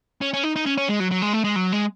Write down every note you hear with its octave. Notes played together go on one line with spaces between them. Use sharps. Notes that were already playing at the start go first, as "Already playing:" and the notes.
C#4
C#4
D#4
D#4
C#4
C#4
G#3
F#3
F#3
G#3
A3
G#3
F#3
G#3